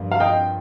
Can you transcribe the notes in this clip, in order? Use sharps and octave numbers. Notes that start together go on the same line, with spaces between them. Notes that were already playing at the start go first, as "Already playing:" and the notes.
Already playing: G2 F3 A#3 F4
F5
D#5 G5